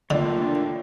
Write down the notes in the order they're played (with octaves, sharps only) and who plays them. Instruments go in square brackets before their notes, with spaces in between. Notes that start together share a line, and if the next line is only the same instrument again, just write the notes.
[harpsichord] D3 [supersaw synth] A3 A#3 D4 [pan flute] F4 [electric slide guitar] C#5 G5